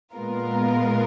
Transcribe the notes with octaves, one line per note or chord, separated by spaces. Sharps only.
A#2 G#3 B3 F4 A#4